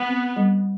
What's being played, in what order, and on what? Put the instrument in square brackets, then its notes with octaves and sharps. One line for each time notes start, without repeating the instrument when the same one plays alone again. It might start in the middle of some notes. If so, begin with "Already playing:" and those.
Already playing: [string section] B3
[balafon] C4
G3